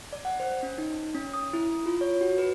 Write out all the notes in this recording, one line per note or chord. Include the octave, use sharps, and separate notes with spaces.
D5
F#5
C5
C#4
D#4
C#4
D#6
E4
F4
C#5
F#4
B4